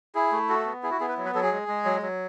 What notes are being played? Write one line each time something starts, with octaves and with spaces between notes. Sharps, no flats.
E4 G#4
A3
F#4 A4
B3
E4 G#4
F#4
B3 G#4
B4
F#3
B4
F#3 A4
G#4
G#3
G#3
F#3
F#3